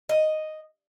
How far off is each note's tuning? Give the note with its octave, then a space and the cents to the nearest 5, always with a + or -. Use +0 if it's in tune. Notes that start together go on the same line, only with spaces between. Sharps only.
D#5 +0